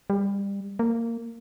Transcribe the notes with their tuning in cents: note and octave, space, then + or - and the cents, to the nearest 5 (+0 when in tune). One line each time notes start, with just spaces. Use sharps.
G3 +25
A#3 -15